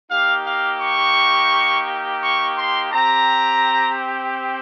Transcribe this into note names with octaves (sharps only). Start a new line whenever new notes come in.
A#3 D#4 G4 F5
F5
C#6
C#6
C6
C4 G4 A#5